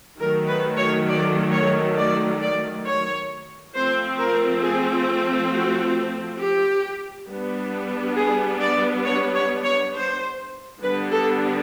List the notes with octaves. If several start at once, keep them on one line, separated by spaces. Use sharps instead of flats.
D#3 F#3 A3 A#4
B4
C#5
D5
C#5
D5
D5
C#5
F3 A3 C4 C5
A#4
G#4
F#4
G4
G3 B3 D4
G#4
D5
C#5
C#5
C#5
C5
D3 G3 B3 D4 B4
A4